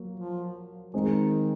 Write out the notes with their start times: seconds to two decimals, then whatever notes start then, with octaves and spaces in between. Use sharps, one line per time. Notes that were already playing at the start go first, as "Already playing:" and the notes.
Already playing: F#3 A#3
0.20 F3
0.94 D#3 G#3 C4 D#4 G#4